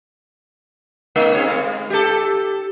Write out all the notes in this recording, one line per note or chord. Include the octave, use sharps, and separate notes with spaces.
A3 D#4
C4 G#4 C#5
G#3
G4 A4